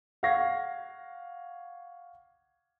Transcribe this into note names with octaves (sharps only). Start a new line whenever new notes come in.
F5 F#5 C#6 G#6 A#6 C7